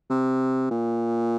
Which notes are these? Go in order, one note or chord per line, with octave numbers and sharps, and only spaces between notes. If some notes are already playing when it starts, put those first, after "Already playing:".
C3
A#2